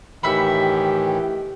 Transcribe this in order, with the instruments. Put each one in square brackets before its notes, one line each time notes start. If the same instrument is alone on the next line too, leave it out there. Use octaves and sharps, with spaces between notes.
[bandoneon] A2 D#3 E3 [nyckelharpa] G4 [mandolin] E5 F#5 B5